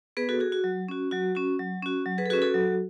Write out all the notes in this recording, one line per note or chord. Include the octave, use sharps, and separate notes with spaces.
B3 G#4 B4
F#4 A4
F#4 G#4
F#4
F#3
C#4 F#4
F#3 F#4
C#4 F#4
F#3
C#4 F#4
F#3
G#4 B4
A4
F#4 G#4 B4
C#4
F#4 A4
F#3